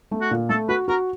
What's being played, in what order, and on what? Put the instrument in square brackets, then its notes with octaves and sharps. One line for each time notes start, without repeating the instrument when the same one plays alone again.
[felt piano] A3
[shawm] F#4
[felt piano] A#2
[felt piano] A3 [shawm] A4
[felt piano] F#4 [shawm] B4
[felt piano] F#4 [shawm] A#4